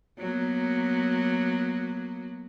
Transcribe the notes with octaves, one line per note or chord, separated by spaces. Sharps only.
F#3 A#3 B3